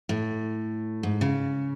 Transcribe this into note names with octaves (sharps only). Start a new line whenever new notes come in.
A2
G#2
C#3